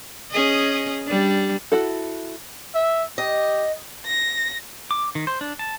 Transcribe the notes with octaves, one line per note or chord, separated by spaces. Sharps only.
C#4 G#4 D#5
G3 D4
E4 F#4 A4
E5
G4 D#5
A#6
D6
D#3
C5
D4
A5